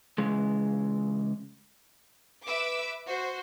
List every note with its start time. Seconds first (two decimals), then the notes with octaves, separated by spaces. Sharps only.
0.18 C#3 E3 G#3
2.46 B4 E5 D6 E6 D7
3.07 F#4 C5